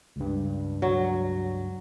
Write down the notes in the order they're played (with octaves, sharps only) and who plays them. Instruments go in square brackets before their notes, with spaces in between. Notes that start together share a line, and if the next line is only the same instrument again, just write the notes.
[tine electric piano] C#2 G2
[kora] F#3